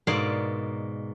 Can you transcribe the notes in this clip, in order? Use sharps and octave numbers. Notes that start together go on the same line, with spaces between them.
G#2 B2 A#3 D5 C6